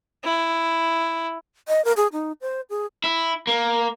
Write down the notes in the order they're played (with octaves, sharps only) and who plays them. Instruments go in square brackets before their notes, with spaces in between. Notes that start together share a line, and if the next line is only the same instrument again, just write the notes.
[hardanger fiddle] E4
[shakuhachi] D#5
A#4
G#4
D#4
C5
G#4
[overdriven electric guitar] E4
A#3